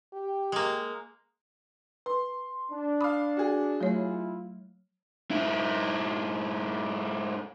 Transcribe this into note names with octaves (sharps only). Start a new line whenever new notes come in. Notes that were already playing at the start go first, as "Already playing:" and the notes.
G4
G#3 A#3
B4 C6
D4
F5 B5 D6 D#6
F#4 G#4
F#3 A3 E4 F4 C#5
G#2 E4